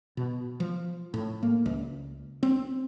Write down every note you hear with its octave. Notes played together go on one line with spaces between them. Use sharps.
B2
F3
A2
A#3
C#2
C4